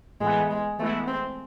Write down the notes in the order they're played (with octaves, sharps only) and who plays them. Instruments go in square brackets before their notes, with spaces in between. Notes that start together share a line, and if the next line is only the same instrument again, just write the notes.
[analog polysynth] A2 E3 B3 [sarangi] G#3
[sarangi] G#3
[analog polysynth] E3 G#3 B3 E4 [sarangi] A3
[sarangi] C4